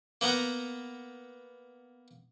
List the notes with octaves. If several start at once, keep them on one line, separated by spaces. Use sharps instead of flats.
A#3 B3 F#5 A#5